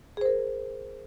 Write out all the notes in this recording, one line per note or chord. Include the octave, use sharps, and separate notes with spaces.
G#4 A#4 C5